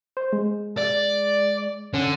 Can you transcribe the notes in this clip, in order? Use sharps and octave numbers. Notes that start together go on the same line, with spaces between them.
C5
G#3
D5
D3 C#4